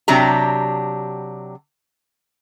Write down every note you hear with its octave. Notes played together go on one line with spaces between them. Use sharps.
C3 F#3 D4 G4 A#5